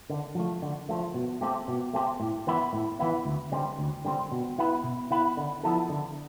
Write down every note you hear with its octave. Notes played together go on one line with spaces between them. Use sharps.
D3
F3 A3
D3
F3 A3
B2
A3 C4 G4
B2
A3 C4 G4
A2
E3 B3 E4
A2
E3 B3 E4
D2
D3 G3 C4
D2
D3 G3 C4
B2
B3 E4 B4
B2
B3 E4 B4
D3
F3 B3 E4 A4
D3